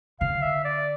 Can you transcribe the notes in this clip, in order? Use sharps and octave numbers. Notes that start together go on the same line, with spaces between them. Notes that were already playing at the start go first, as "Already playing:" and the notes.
D3 F5
E5
D5